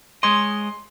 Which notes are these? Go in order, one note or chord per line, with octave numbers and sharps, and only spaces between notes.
G#3 C#5 D#5 C6